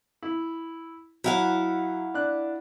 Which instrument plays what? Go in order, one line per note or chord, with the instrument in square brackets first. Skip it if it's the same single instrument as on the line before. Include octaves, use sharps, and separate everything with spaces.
[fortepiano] E4
[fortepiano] F#3 [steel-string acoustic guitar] E4 F5 F#5
[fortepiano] D4 F#6